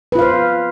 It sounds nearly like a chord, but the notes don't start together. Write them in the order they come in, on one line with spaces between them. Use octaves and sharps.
B4 F4 F5 C5